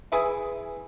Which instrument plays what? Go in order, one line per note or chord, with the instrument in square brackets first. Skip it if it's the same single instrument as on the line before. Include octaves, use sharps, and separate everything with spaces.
[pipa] E3 G#4 B4 E5